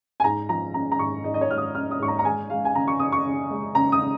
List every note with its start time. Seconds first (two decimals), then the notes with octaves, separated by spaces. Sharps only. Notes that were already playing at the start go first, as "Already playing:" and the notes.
0.20 G#5
0.24 G#2 A#5
0.49 F3 A#5
0.74 C#4 A#5
0.92 A#5
0.99 G#2 C#6
1.24 G#2 D#5
1.34 D#5
1.41 C#5
1.50 G#2 F6
1.58 D#6
1.75 C#4 F6
1.91 D#6
1.99 G#2 C#6
2.08 A#5
2.19 A#5
2.25 G#3 G#5
2.50 G#3 F5
2.65 G#5
2.75 C#3 A#5
2.88 C#6
2.99 C#3 D#6
3.12 C#6
3.25 C#3
3.51 G#3
3.75 C#3 A#5
3.92 D#6
4.00 C#3